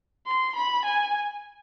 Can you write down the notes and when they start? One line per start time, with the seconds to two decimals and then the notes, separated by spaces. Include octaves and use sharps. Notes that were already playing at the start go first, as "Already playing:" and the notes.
0.27 C6
0.55 B5
0.85 G#5